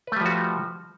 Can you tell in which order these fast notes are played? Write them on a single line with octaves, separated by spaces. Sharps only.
B4 A3 G3 F3 F#4